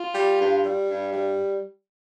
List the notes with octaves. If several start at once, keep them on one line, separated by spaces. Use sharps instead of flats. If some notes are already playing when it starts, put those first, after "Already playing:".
Already playing: F4
G3
G2
G3
G2
G3